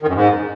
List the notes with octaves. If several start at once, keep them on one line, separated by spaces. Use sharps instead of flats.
D#3
F#2
G#2